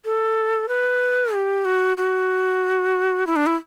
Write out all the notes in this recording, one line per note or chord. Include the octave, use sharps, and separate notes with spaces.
A4
B4
G4
F#4
F#4
E4
D4
E4